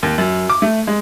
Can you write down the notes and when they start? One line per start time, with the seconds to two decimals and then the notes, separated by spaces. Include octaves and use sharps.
0.03 D#2
0.18 F#2
0.50 D6
0.62 A3
0.87 G#3